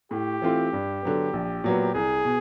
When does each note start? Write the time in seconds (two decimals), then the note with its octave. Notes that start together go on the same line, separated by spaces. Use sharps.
0.11 A2 G4
0.42 E3 A3 C4 F4
0.73 G2
1.03 D3 F#3 B3
1.33 A#1
1.64 A#2 F#3 B3
1.94 C2 G#4
2.25 B2